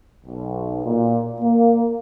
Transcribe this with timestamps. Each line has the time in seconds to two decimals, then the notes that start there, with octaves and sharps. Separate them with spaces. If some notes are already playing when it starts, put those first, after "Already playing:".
0.25 B1
0.83 A#2
1.41 A#3